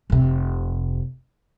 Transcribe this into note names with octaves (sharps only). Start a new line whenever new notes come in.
F1 C3